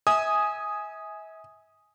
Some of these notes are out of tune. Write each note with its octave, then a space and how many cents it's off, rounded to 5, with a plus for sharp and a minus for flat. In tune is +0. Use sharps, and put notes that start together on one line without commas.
E5 -40 G#5 +0 D#6 +0